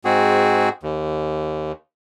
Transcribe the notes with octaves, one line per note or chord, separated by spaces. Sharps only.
G#2 C4 F#4 G#4
D#2